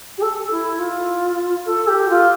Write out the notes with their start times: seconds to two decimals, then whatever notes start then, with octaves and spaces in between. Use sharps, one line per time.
0.17 G4
0.22 A4
0.51 E4
0.79 F4
1.65 A4
1.87 G4
2.09 F4